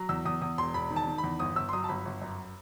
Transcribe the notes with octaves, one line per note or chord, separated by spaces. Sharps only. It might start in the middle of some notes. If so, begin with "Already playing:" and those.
Already playing: F#3
E2 E6
E2 D#6
E2 D#6
E1 C6
E1 B5
D#3
A5
D#3
B5
E2
G1 D#6
G1 E6
C6
F#3 D#6
A5
G1 B5
G1
F#2